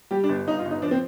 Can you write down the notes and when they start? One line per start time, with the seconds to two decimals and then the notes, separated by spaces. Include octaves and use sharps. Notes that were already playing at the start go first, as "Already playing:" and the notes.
0.11 G3 G4
0.24 D4
0.29 G1
0.47 G2 D#4
0.59 F4
0.65 G1
0.71 D#4
0.82 F3 D4
0.91 C4